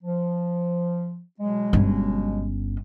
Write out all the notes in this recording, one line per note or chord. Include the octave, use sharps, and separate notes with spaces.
F3
B2 F#3 G#3
G1 C#4